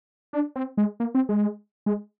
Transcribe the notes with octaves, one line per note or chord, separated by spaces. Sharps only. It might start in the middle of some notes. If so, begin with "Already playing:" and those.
D4
C4
G#3
A#3
C4
G#3
G#3